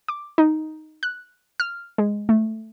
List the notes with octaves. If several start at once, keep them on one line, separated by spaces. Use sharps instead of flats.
D6
D#4
F#6
F6
G#3
A3